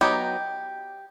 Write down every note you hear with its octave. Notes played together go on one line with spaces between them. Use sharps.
F#3 B3 D#4 G4